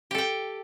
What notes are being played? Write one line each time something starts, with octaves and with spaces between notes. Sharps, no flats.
G4 A4 G5